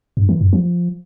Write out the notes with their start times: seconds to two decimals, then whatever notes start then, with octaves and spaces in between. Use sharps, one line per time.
0.17 G2
0.29 E3
0.41 F#2
0.53 F3